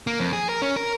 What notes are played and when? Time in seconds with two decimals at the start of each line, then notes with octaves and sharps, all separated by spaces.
0.07 A#3
0.19 F2
0.33 G#4
0.49 A#4
0.62 C#4
0.76 A#4